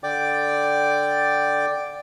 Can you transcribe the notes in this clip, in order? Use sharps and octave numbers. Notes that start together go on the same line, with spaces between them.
D3 D5 G5 D6